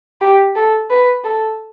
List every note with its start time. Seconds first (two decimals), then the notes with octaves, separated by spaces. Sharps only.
0.21 G4
0.56 A4
0.90 B4
1.24 A4